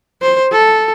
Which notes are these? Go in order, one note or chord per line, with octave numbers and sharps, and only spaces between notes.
C5
A4